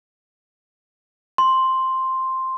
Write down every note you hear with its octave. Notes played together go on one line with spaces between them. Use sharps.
C6